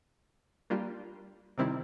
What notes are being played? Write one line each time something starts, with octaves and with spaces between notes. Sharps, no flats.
G3 A#3 D4 F4
C3 D#3 G3 C4 E4